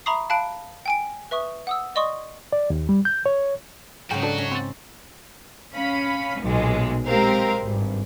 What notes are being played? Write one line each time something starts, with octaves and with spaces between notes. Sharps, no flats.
E5 A#5 B5 C#6 D#6 C7
F5 A5 B5 F#6 D7
G5 G#5 D7
B4 E5 C#6 D#6
F#5 D#6 E6
D5 D#5 C6 C#6 D#6
D5
D#2
G3
G6
C#5
G#2 C#3 F#3 F#4 G5
D4 A4
C#4
C4 A6
C#4 F5 B5
B1 A#2 G#3
G#3 C4 G4 A#4 C5 F5
G#1 G2